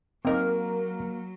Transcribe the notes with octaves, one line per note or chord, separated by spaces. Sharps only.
F#3 A#3 C4 D#4 A#4 D#5